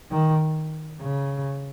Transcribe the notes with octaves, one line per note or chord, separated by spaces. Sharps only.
D#3
C#3